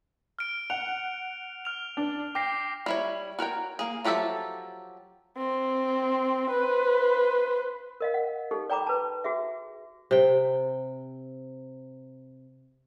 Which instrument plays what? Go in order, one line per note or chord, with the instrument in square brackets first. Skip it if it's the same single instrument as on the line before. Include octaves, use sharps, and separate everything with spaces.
[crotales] F6 D7
[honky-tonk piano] F#5 [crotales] F7
[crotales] F6 F7
[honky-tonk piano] D4
[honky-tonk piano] G5 [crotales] D6 A#6 C7
[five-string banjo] G3 E4 C#5
F#4 A#4 C#5 G5
A#3 G#4
F3 F#3 G4 A4 E5
[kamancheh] C4
B4 C5
[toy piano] A#4 D#5 F5
F#5
D#4 G4 A4
D5 G5 A#5 B5 D6
B4 A5
F#4 G#4 E5
[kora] C3 G5